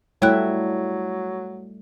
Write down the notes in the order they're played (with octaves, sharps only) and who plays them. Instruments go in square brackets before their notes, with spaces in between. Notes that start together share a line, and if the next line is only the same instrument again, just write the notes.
[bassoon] F#3 [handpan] G3 A3 A4 [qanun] E4 [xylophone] C#5 G5 F#6